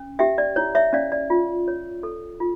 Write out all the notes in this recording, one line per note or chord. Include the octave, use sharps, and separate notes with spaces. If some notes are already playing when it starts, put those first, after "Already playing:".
Already playing: C#4
G4 E5 G5
D5
E4 C#5
C#5 E5
C#4 D5 F5
D5
F4
C#5
A4
F4